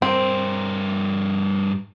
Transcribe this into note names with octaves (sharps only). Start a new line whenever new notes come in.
G2 C4 A#4